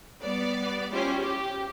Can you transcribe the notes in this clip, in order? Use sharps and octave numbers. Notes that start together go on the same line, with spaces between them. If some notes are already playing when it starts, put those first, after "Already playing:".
G3 B3 D5
C#4 E4 F4 G4 C5 C#5
G4